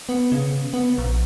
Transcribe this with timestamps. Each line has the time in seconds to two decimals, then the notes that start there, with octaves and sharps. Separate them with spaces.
0.09 B3
0.32 C#3
0.73 B3
0.98 A#1